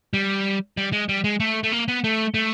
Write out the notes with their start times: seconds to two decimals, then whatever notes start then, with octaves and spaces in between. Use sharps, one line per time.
0.14 G3
0.77 G3
0.93 G#3
1.09 G3
1.24 G#3
1.40 A3
1.63 A3
1.72 A#3
1.88 B3
2.04 A3
2.34 A3